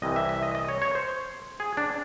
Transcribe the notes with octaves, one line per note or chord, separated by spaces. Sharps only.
C2 C3 E3 D#5
E5
E5
D#5
D#5
C#5
C#5
C5
G#4
D4